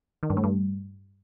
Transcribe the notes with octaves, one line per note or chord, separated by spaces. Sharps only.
D#3
G2
A2
G2